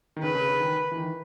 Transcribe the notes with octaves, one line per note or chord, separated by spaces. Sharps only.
D#3
C#3 B4
C#3
C#3
D#3
E3
D#3